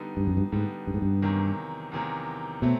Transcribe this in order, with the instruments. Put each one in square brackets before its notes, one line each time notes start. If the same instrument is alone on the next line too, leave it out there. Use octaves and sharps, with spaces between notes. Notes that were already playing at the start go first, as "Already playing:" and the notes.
Already playing: [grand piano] D3 G3 B3 D#4
[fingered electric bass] G2
F#2
G2
[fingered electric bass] G#2 [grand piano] D3 G3 B3 D#4
[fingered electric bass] G2
G#2
G2
[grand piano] E2 C3 D#3 F#3 A#3
E2 C3 D#3 F#3 A#3
[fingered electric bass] B2 [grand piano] F#3 A3 C4